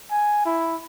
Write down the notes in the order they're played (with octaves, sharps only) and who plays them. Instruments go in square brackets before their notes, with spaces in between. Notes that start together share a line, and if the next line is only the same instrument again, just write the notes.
[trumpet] G#5
E4